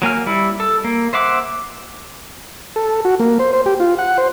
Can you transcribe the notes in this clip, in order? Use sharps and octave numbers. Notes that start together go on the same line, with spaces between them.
F#3 A#3 G#5 F6
G3 E4
A4
A#3
C5 E5 F#5 D6
A4
F#4
A#3
C5
C5
G4
F4
F#5
C5